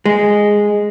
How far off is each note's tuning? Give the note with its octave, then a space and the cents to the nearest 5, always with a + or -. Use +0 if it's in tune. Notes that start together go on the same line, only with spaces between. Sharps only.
G#3 -5